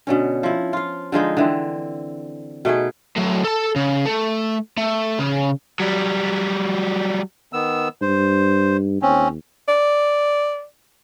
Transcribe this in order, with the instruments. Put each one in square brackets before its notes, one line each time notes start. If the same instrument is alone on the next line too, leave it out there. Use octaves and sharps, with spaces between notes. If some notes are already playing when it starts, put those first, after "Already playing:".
[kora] B2 D3 C#4
F3 E4
F4 F5
D3 F3 G#3 D#4
D3 E3 C4
B2 A3 D#4 G#4
[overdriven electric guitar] A2 F#3
A4 A5
C#3
A3
A3
C#3
F#3 G3
[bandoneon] D#3 B3 E6
[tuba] G2 [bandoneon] C5
[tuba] D#2 [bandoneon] C4 C#4
[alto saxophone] D5